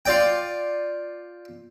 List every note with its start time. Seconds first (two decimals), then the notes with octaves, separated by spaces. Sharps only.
0.05 F4 D5 G5